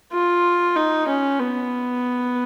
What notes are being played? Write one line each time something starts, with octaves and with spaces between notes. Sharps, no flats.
F4
D#4
C#4
B3